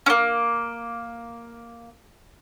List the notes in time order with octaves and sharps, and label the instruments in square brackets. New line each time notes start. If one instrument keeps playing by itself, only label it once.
[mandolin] A#3 C#4